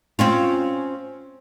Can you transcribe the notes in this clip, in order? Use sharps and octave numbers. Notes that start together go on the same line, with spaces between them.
C4 C#4 F4